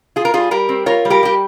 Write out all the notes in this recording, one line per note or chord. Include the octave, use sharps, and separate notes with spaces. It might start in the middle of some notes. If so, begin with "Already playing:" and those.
F4 G#4
A#4
G3 F4 G#4
G3 G4 A#4
C4
F4 A#4 C#5
G3
G4 A#4
G3 G4